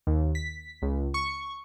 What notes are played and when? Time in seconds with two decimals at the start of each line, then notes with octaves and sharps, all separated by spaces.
0.07 D#2
0.35 B6
0.82 C#2
1.14 C#6